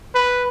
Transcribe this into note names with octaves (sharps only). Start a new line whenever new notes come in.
B4